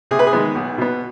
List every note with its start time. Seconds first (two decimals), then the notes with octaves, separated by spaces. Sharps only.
0.11 C3 G#4
0.19 B4
0.27 G#4
0.33 D#3 G#3 B3
0.55 B1
0.78 B2 B3